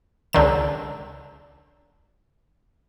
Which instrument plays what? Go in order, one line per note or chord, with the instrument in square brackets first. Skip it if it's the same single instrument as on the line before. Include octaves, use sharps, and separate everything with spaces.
[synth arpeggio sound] C#2 D3 D#3 E7